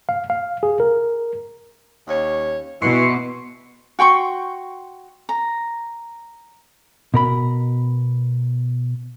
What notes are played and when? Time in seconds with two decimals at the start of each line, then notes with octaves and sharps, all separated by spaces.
0.09 F5
0.30 F5
0.63 G#4
0.80 A#4
2.08 D#2 C#4 C#5
2.82 B2 E3 C6 C#6
3.99 F#4 G5 C6 C#6
5.29 A#5
7.14 B2 A#4 B5